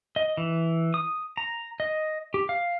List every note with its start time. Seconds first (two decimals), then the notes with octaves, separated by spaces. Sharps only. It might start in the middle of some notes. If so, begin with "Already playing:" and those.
0.16 D#5
0.37 E3
0.94 D#6
1.37 A#5
1.80 D#5
2.34 G4
2.49 F5